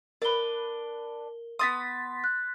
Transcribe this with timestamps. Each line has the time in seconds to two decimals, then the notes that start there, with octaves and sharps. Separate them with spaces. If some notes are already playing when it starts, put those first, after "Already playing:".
0.22 D4 A#4 B4 G7
1.59 B3 C4 C6 D#6 A6 B6
2.24 F#6